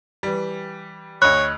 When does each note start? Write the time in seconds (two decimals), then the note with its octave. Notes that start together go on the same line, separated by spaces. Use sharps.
0.23 E3 G3
1.22 D2 C#5 D#5 B5 F#6